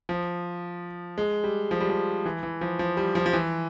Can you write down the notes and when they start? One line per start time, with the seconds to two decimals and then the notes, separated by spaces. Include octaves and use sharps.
0.09 F3
1.18 G#3
1.44 G3
1.71 F3
1.80 G3
1.90 F3
2.26 E3
2.43 E3
2.61 F3
2.79 F3
2.97 G3
3.15 F3
3.26 F3
3.33 E3